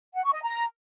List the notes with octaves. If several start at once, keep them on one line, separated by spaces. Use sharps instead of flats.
F#5
C#6
D#5
A#5